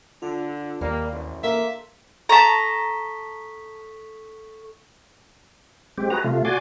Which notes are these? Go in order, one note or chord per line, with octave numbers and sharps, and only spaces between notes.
D3 F4
D#2 G3 A#3
A1 D2
A#3 A4 E5 C6
A4 A5 A#5 C#6 B6
G#3 C4 G4
F#4 G#4 B4 A#5
C3 A3 F4
F#4 D5 G#5 C6 D6